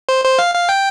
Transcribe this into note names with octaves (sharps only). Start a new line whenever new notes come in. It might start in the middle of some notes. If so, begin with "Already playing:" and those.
C5
C5
F5
F5
G5